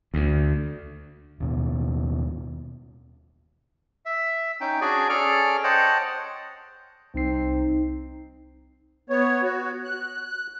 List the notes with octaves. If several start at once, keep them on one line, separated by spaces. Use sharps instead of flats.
D2
D#2 B2
E5
C#4 D#4 G5
C#4 D4 F#4 G#4 D5 G#5
C#4 G#4 A4 D5 F6
C5 C#5 D#5 F#5 G5 A5
C2 C4 D#4 C7
B3 C#5
F#4
F#6